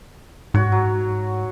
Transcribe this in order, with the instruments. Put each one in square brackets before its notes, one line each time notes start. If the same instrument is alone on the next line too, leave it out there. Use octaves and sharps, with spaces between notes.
[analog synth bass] G#2 [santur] F#4 C#5 F#5
[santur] F#3